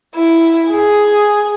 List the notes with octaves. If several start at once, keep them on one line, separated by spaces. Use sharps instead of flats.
E4
G#4